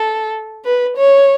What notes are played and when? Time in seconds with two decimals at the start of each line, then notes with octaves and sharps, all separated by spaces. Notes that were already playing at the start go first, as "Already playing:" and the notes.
Already playing: A4
0.65 B4
0.97 C#5